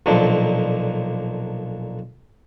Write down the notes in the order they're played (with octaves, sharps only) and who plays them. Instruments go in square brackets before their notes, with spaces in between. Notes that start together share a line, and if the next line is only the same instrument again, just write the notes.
[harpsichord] B1 A#2 D3 F3 D4